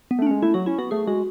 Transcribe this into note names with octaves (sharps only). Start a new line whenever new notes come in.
B3
A3 D4
G#3 C#4
A3 E4
F#3 F#4
C#4 E4
B3 F#4
A3 G#4
G#3 F#4